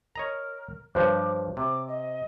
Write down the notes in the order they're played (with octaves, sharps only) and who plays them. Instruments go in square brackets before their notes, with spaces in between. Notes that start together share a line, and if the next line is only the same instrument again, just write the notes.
[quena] A#4 [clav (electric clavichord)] C#5 D#5 A#5
[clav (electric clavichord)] G2 F3 [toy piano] C5 C#5 [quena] D6
[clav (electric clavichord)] C3 [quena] D6
[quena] D#5